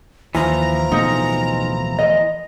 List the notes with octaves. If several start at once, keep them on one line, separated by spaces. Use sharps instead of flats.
D#2 E3 F3 A#5
D1 B2 A3 D#4
D#5